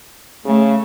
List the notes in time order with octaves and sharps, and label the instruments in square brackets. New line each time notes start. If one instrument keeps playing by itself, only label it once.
[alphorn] C#3 [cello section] A3